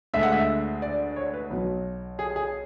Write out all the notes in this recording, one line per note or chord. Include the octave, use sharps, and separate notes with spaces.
D2 D3 G#3 E5
F#5
E5
D5
D5
C#5
B4
B1 B2 F#3
G#4
G#4